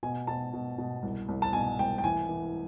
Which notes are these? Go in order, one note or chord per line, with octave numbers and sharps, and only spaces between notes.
B2 G#5
B2 A5
B2
B2
C2
C2
A5
B2 G#5
C2 G5
G5
E3 G#5
E3